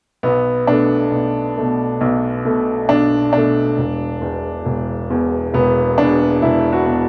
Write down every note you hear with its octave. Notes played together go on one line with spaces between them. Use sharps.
B1 B3
B2 A3 D4
B1
B2 A3
B1
B2 A3
B1 D4
B2 A3 D4
E1
E2 B2
E1
E2 B2
E1 B3
E2 B2 D4
E1 E4
F#4
B2